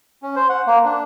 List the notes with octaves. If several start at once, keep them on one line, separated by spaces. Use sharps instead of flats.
C#4
C5
F#5
A#3
D4